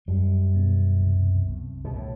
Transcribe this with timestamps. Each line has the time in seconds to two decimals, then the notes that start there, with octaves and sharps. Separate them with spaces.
0.08 F#2 G3
0.55 B2
1.02 C2
1.48 C2
1.84 B2
1.95 A2